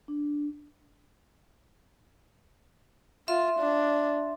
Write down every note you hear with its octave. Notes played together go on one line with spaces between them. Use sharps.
D4
F4 E5 C6
D4